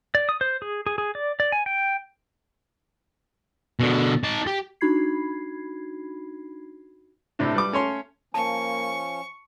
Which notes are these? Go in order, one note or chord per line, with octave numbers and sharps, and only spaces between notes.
D5
D#6
C5
G#4
G#4
G#4
D5
D5
G#5
G5
B2 D3
D#4 A5
G4
D4 D#4 F#4 B5 G#6 C7
A2 C3 D4
G3 B4 D6
A3 C#4 C#5 C6
F3 A#3 C#4 A5 C#6